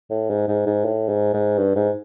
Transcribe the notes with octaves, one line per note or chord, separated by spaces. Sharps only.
A2
G#2
G#2
G#2
A2
G#2
G#2
G2
G#2